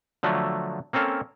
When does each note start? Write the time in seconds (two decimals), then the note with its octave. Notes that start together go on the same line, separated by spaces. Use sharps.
0.23 D3 F3 F#3 A3
0.93 A#3 C4 C#4 A4 F5